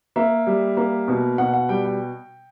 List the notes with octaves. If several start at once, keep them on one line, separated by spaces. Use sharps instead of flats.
A#3 E5
G3
A#3
B2
B2 F#5
F#5
G3 G5
G5